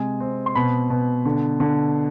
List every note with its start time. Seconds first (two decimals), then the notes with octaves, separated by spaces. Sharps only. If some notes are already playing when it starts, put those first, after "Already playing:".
Already playing: C3 G#3 G#5
0.20 C4
0.46 C6
0.55 B2 B5
0.90 B2
1.25 D3
1.60 D3